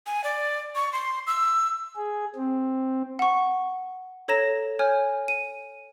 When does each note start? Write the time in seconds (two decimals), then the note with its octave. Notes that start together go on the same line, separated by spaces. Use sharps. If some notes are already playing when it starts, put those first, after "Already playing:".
0.06 G#5
0.24 D5
0.75 C#6
0.93 C6
1.27 E6
1.96 G#4
2.36 C4
3.19 F#5 C#6
4.28 A4 C#5 A#5 A#6 E7
4.79 C#5 G#5 F6 G6
5.28 D#7